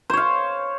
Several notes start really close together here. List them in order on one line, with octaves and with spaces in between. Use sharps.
C5 C#5 F5